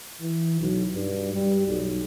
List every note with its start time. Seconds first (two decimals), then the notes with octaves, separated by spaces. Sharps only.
0.21 E3
0.59 B1
0.94 G2
1.33 G3
1.67 B1